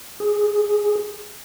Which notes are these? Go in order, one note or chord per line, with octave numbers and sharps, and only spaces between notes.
G#4